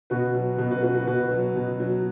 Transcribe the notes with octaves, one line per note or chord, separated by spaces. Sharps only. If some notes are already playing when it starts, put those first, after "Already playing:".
B2 F#4 B4
F#3
B2
F#4 B4
F#3 F#4 B4
F#4 B4
B2 F#4 B4
F#3
B2
F#3